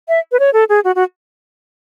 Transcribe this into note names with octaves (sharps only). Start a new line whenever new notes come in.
E5
B4
C#5
A4
G#4
F#4
F#4